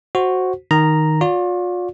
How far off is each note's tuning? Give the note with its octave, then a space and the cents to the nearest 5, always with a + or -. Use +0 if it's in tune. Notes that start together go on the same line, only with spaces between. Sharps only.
F#4 +0 C5 +10
D#3 +0 A#5 +0
F4 +40 D5 -35